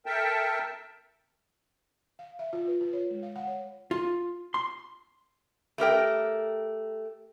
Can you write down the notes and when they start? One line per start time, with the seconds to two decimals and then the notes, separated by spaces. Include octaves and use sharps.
0.06 A4 A#4 E5 G5 A5
2.19 F5
2.39 E5
2.53 F4
2.67 B4
2.81 F4
2.93 C#5
3.11 G#3
3.23 F5
3.36 F#5
3.47 C#5
3.91 F4
4.54 C6
5.78 A3 G4 A#4 G5